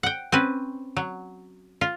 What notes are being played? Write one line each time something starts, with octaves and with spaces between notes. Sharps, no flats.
F#5 G5
C4 C#4 B4
F#3
F4